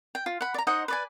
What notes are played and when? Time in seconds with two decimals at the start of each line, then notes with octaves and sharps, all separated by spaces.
0.15 G5
0.26 F4
0.41 F#5 B5
0.54 D5 A#5
0.67 D#4 C5 D#5 F#5
0.88 B4 D5 G#5